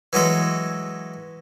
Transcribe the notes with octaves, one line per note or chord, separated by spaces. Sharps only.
E3 F#3 G#3 A4